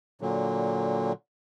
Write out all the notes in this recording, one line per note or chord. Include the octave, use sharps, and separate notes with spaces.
A#2 D3 F#3